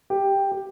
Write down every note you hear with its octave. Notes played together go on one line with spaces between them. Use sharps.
G4
G4